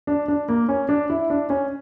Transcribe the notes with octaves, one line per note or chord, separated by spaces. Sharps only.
D4
D4
A#3
C#4
D4
E4
D4
C#4